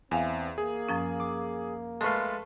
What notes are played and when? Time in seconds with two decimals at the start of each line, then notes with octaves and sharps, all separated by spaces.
0.11 E2 C4 E5 F5 G#5
0.58 A#3 G#4
0.89 F#2 F3 C#4
1.20 D6
2.01 G#3 A3 F4 A4 B4 A5 C6